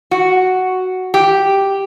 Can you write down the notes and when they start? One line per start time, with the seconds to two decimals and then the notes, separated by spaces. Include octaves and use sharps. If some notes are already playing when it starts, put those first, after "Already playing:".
0.11 F#4
1.14 G4